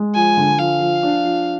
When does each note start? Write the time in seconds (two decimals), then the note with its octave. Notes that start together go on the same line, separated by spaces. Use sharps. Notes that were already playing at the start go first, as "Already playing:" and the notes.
Already playing: G#3
0.15 F3 G#5
0.37 D3
0.59 F3 F5
0.80 F3
1.03 D4
1.24 F3